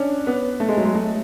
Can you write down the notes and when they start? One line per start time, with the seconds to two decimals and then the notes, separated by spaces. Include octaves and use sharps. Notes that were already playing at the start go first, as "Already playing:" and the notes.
Already playing: C#4 D4
0.27 B3
0.60 A3
0.69 G#3
0.77 F#3
0.85 G#3
0.94 A3